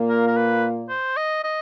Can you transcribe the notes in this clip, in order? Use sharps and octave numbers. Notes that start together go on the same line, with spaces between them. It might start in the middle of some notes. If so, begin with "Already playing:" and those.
Already playing: A#2 A#3
A#4
A#4
B4
C5
D#5
D#5